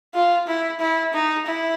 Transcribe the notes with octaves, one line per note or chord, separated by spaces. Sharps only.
F4
E4
E4
D#4
E4